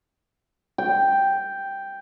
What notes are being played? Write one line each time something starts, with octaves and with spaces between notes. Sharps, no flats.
G5